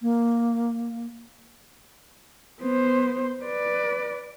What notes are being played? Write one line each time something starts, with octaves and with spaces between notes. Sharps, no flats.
A#3
B3 C5
B4 D5